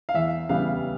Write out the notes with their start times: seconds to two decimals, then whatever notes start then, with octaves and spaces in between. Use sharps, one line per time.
0.09 F5
0.14 E2 E5
0.49 C#3 E3 G3 B3 F5